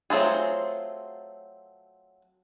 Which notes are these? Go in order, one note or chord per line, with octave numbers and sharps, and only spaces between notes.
F#3 A3 C4 F4 G#4